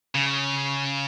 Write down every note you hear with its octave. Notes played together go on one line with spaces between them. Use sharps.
C#3